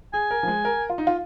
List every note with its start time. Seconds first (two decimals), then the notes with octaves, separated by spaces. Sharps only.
0.13 G#4 G#5
0.31 A#4
0.43 F3
0.48 G#3
0.65 A#4
0.90 F4
0.98 D#4
1.07 F4